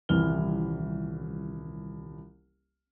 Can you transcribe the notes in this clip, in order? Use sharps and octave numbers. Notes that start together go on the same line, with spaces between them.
D#1 C2 E3 C4 F6 G7